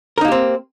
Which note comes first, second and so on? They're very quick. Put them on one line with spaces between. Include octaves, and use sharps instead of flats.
A#4 D#4 A#3 G4 C4